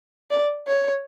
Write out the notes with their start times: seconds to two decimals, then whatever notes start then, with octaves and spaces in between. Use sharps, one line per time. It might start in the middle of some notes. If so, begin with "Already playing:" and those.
0.30 D5
0.68 C#5